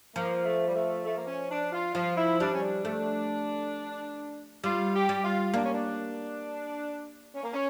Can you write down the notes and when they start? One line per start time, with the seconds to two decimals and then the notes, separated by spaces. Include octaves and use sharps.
0.15 F3 A#3
0.45 A3
0.67 G3
0.75 A3
1.05 A3
1.16 A#3
1.27 C#4
1.50 D4
1.72 F4
1.95 F3 F4
2.17 E4
2.40 G3 D4
2.54 C#4
2.62 D4
2.85 A3
4.64 G3 F4
4.94 G4
5.09 G3
5.24 F4
5.54 A#3 D4
5.64 C#4
5.74 D4
7.34 C#4
7.43 A#3
7.53 C#4